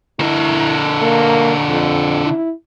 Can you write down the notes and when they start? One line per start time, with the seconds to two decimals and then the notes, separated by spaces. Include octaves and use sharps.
0.19 D3 E4 A#4
1.02 A#3
1.69 F2
2.26 E4